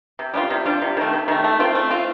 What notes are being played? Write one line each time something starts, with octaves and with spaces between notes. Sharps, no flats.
C3
G3 D4 F4
C3
G3 D4 F4
C3
D#3 A3
C3
D#3 A3
A3
C4 F4
A3
C4 F4